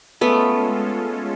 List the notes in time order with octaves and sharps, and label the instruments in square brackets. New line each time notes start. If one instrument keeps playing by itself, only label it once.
[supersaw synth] G#3 C#4 F4 A4 [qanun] A3 B3